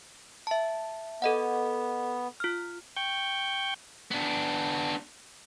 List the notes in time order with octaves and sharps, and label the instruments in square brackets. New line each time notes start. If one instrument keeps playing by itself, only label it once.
[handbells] E5 A5
[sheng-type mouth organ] B3 [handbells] A4 D#5 F#5
[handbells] F4 F6
[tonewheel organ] G5 C#6 G6
[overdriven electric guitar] B3 D4